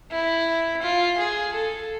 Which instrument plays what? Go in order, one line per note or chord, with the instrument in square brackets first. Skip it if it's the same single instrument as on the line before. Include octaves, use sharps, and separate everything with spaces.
[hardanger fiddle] E4
F4
G#4
A4